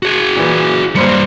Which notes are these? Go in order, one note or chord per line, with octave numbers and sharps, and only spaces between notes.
F#4 G#4
A#2 E3
G2 G3 A#3 C5 C#7